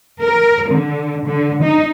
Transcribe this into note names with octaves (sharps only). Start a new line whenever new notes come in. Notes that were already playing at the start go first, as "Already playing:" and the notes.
A#4
D3
D3
D#4